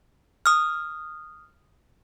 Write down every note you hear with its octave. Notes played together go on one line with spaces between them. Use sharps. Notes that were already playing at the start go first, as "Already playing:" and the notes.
D#6 F6